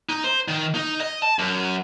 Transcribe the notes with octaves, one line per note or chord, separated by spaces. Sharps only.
D#4
C5
D#3
D#4
D#5
A5
F#2